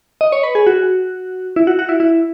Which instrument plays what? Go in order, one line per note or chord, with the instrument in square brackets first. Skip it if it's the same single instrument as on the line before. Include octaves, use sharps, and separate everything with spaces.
[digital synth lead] D#5
C#5
B4
G#4
F#4
E4
F#4
F#4
E4
E4